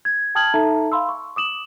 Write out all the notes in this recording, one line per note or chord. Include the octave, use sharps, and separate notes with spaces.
G#6
G5 A5 D#6 F6 G#6 F#7
D#4 A4 E5 A5 A#5
F5 B5 C6 E6
C#6
D6 D#6 E7 F#7